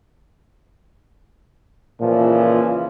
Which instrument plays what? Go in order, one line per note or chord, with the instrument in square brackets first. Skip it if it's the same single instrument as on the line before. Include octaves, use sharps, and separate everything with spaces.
[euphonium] A#2 [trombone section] C#3 E3 F3